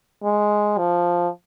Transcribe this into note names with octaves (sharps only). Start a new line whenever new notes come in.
G#3
F3